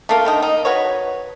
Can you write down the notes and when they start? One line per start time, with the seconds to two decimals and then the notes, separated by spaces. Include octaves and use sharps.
0.09 A3 A#3 F4
0.25 D3 D#3 D#4
0.42 D#4
0.65 F#4 B4 C#5